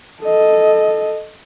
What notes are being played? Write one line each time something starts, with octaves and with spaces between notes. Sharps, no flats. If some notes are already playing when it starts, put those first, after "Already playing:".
A4 D#5